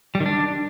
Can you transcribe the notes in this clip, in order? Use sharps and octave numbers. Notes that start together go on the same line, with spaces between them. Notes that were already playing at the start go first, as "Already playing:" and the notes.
G3
D#3
D4